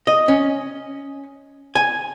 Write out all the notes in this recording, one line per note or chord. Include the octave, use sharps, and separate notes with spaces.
D#5
C#4
G#5